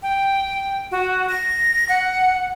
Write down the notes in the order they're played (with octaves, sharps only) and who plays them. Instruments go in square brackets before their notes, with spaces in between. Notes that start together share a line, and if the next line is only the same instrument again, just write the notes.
[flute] G5
F#4
A#6
F#5